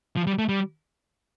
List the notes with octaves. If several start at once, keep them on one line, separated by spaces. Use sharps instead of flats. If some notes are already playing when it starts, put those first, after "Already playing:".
F3
G3
A3
G3